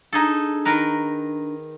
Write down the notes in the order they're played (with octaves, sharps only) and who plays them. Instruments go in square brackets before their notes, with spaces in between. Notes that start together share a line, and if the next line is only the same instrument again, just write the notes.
[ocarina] D4 [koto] D#4 G#4 A4
[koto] D#3 A#4 B4